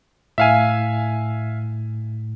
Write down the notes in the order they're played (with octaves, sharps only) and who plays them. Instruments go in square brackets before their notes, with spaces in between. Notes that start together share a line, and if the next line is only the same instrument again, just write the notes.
[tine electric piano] A2 [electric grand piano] E5 F5 G#5